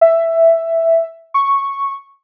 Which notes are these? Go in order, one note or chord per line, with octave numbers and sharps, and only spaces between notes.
E5
C#6